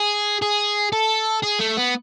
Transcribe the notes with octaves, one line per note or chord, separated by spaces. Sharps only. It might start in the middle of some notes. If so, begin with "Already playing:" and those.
Already playing: G#4
G#4
A4
G#4
A3
B3